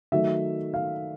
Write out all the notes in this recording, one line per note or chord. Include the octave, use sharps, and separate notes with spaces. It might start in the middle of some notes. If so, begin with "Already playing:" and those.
D#3 F#3 A3 E5
F5